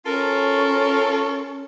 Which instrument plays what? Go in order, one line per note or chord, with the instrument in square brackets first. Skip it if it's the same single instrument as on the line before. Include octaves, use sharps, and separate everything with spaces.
[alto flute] C#4 [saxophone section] F4 A#4 [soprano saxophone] A4